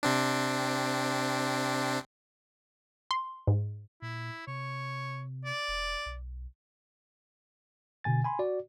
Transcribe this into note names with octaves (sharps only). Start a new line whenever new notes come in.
C3 C4 D4
C6
G#2
A#2 E4
C3 C#5
D5
E1
B1
B2 D3 G#5 A6
G#5 B5 C6
F#4 D5